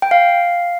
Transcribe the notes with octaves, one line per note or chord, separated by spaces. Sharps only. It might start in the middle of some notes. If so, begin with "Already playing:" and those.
G5
F5